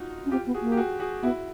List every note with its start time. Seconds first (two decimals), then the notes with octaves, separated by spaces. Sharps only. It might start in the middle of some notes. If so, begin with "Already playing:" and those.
Already playing: D#4 F4 F#4
0.26 C#4
0.31 C4 F4 G4
0.47 B3
0.54 F#4 G#4
0.62 A#3
0.72 G4
0.77 F#4 G#4
1.00 F#4 G#4
1.22 B3 E4 F#4